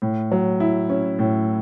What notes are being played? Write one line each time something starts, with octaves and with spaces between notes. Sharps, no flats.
A2
F#3
E4
C#4
A2